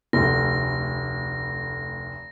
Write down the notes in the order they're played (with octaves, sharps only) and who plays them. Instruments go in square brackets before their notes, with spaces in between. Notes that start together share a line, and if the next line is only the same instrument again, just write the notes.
[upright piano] F1 D2 [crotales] A#6